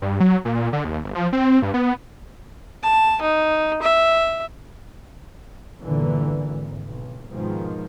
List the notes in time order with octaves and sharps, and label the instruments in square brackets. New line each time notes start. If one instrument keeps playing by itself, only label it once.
[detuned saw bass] G2
F#3
A#2
D3
D#2
G1
F3
C4
G2
B3
[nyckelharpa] A5
D#4
E5
[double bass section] G1 A#2 D3 E3
G#1
B1
G#2 B2 D#3 F3